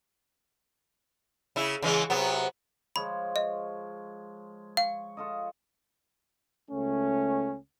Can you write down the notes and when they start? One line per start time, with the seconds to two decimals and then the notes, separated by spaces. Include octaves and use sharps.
1.56 C#3 E4
1.82 C#3 E3 G#3
2.10 C3 F#3 B3
2.96 F3 G#3 C#5 B5
3.36 D#5
4.77 F5 C#6
5.17 F4 A4 D#5
6.71 C#2 A3 C#4